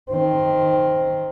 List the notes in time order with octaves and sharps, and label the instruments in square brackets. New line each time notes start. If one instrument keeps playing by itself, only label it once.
[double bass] D#3 C4